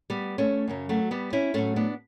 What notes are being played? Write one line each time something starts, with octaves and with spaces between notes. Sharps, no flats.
G3 B3
A3 C#4
F#2 C#3 F#3
F#3 A3
G3 B3
C#4 E4
A2 F#3 A3 C#4
B3 D4